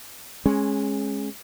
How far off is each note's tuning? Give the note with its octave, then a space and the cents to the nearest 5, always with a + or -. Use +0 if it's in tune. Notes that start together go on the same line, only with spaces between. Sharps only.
G#3 +5 C#4 -20